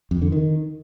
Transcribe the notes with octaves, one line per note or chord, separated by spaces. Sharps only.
F2
D3
D#3